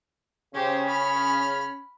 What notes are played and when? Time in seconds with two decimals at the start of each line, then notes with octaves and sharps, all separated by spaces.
0.54 C#3 C#4 G4 C5
0.87 B5 F6